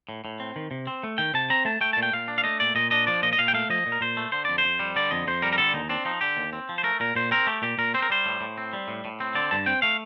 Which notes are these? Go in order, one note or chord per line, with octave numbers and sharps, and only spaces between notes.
A2
A2
C4
D#3
C3
C4
A3
D#3 G5
C3 A5
C4 A#5
A3 A5
A3 G5
A#2 A5
G5
A#2 F5
D4
F5
A3 D#5
A#2 D5
A#2 D#5
D4 D#5
F3 D5
A#2 D#5
D#5
A#2 F5
G5
A3 F5
F3 D#5
A#2
A#4
A#2 C5
A3
D3 C5
F2 D5
C5
F2
G3
D3 D5
F2 D#5
F2 C5
G3 A#4
A#4
D3 A4
D#2 D#4
C4 D4
F3 D#4
D3 G4
D#2
C4
F3
C5
A3 A#4
A#2 A#4
A#2 C5
C4 A#4
A3 G4
A#2 G4
A#2 A#4
C4 C5
A#4
G3 C5
A2
A2
C4
G3
A2
A2
C4
D3 D5
G2 A5
C4 G5
A3 F5